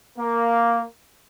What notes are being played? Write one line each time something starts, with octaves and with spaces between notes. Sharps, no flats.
A#3